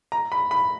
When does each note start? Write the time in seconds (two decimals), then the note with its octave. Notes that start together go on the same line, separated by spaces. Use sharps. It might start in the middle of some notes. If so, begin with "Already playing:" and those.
0.12 A#5
0.32 B5
0.51 B5